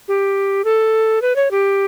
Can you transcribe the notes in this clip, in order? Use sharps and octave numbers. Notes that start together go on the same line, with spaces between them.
G4
A4
B4
C#5
G4